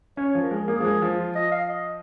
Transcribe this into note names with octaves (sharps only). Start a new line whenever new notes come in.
C#4 C#5
F3
A#4
G#3
A#3 G#4
F3
G#3
F3
F4
D#5
F5
D#5